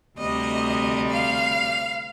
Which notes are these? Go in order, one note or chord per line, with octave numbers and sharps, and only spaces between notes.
D2 C3 G3 D#5
F5